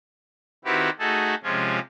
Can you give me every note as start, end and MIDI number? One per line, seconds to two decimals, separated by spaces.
0.65 0.90 51
0.65 0.90 60
0.65 0.90 64
0.65 0.90 66
0.65 0.90 67
0.65 0.90 71
0.99 1.35 57
0.99 1.35 63
0.99 1.35 66
0.99 1.35 68
0.99 1.35 69
1.43 1.79 48
1.43 1.79 53
1.43 1.79 56
1.43 1.79 61
1.43 1.79 65